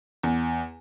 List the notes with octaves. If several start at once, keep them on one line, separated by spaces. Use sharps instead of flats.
E2